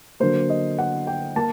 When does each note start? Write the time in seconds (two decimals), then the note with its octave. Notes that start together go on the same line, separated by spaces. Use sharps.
0.20 D3 F#3 A#3 C5
0.50 D#5
0.79 F#5
1.07 G5
1.36 A#3 A5